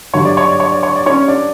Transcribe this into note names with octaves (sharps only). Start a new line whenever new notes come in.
G2 D3 F#3 C#5
D5
C#5
D5
C#5
D5
C#5
D5
C#4 C#5
D4 D5